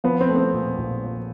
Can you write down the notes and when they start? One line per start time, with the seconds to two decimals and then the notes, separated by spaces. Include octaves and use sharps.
0.04 F3 B3
0.21 C4
0.29 A3
0.36 C4
0.53 A#2
0.77 A#1
1.03 F3